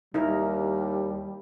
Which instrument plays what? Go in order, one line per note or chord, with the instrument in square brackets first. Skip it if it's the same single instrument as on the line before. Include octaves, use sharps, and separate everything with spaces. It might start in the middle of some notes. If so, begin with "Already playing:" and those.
[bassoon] D#2 [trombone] G3 [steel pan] D#4 E4 A#4